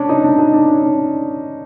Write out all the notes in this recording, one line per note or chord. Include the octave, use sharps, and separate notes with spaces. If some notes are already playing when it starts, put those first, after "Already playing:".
Already playing: C#4 D4
D#4
D4
D#4
D4
C#4
D4